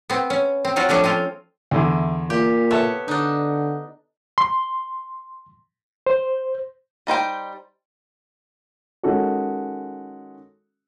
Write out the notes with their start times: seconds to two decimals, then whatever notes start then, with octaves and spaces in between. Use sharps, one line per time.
0.10 B3 C4
0.30 C#4
0.65 C4
0.76 F#3 C4 F4 F#4
0.89 F3 A3 C#4 D4
1.04 C4 C#4 F4
1.71 E2 D3 E4
2.30 A#2 G4
2.71 B3 A4 C#5 E5 A5
3.08 D3 D4 D#4
4.38 C6
6.06 C5
7.07 G3 D#4 C5 G5
9.03 D#3 G#3 C#4 F#4 A4